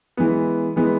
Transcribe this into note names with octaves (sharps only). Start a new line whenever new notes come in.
E3 G#3 B3
E3 G#3 B3